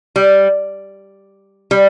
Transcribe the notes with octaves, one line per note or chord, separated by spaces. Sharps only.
G3
G3